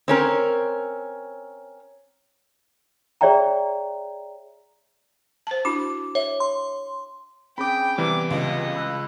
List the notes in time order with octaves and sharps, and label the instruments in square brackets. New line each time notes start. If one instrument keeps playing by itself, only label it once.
[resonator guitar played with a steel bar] C4 C#4 A#4
[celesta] G#4 C#5 D5 E5 G5 A#5
[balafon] C5 A5
[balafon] D4 E4 F#4 [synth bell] D6
[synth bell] C#5 [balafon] E5
[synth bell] C6
[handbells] C4 C#4 G#4 [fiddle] G5 [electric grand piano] B5 D6
[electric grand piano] C3 E3 G3 [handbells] B3 [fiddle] D6
[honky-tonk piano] C#2 [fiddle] D#5
[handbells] B5 E6 F#6